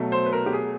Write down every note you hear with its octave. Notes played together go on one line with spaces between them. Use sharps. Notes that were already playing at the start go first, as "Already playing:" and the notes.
Already playing: B2 F#3 A3
C5
B4
A#4
G4
G#4